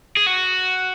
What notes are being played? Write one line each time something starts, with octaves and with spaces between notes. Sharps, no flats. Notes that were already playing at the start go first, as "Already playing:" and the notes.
G#4
F#4